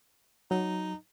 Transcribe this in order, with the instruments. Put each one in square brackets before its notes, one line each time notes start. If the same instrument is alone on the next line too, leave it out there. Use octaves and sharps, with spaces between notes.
[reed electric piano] F#3 [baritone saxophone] D#4